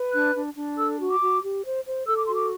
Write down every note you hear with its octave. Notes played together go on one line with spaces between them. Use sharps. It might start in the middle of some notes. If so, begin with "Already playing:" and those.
Already playing: B4
D4 F#6
D4
D4
A4 E6
F#4
D6
F#4
G4
C5
C5
A4 E6
D6
F#4 C6
D6